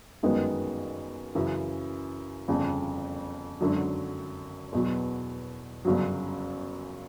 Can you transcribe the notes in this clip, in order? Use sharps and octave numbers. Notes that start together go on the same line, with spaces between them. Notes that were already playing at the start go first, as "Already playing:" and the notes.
G1 F#2 D#3 G#3 B3
F#2 C#3 E3
G1 F2 C#3
G#1 F#2 D3 F#3
E2 B2 F#3
G1 F#2 C#3 F#3